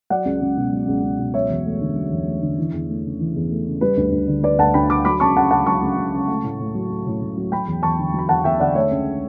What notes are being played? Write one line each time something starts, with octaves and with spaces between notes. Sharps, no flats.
F#3 D5 F#5
C#2
C#2
B2
F#3
C#2
C#2
B2
F#3 C#5 E5
E2
A3
D3
F#3
E2
A3
D3
E3
E2
A3
C#3
E3
E2
A3
C#3
G3 B4
D2
D2
D3
G3 B4 D5
D2 F#5 A5
D2 G5 B5
D3 B5 D6
F#3 B5 D6
C#2 A5 C#6
C#2 F#5 A5
C#3 F#5 A5
F#3 A5 C#6
C#2
C#2
C#3
A3
A2
A2
F#3
A3
A2
A2
F#3
F#3 G5 B5
E2
E2 A5 C#6
D3
F#3 B5
E2 F#5 A5
E2 E5 G5
D3 D5 F#5
A3 C#5 E5
C#2